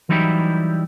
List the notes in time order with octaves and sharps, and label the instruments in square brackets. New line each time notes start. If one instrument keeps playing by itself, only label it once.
[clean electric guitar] E3 F#3 G3 D#4 E4 G4